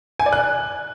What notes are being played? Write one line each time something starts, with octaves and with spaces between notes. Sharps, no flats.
G#5
D5
F#6